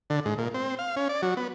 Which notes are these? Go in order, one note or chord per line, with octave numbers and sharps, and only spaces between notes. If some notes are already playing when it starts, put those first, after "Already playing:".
D3
G#2
A#2
C4
F5
C#4
D5
F#3
B3